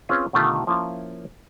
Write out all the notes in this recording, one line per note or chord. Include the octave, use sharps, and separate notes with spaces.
C4 C#4 F4 G#4 B4 C5
B2 D3 D#3 A3 F4 G4
F3 A#3 C#4 E4 F4